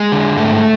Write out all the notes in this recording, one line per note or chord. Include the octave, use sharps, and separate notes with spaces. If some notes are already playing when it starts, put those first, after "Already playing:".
Already playing: G#3
D3
G#2 A3